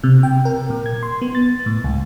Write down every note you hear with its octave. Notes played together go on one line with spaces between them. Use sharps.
C3
G5
A#4
A#2
G#6
C6
B3
A6
A2
C#2